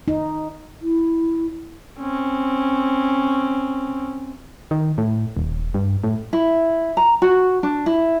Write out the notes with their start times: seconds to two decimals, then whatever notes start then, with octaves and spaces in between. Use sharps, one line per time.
0.08 D#4
0.81 E4
2.00 C4 C#4
4.71 D#3
4.98 A2
5.37 D#1
5.74 G2
6.04 A2
6.33 E4
6.97 A#5
7.22 F#4
7.63 D4
7.86 E4